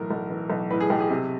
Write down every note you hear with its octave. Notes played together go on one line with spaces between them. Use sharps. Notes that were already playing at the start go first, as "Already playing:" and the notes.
Already playing: B1 A2 E3 A#4
B1
E3
B1
A2 B4
G#4
B1 G4
G#4
C3